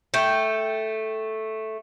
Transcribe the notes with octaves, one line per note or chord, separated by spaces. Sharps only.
A3 G5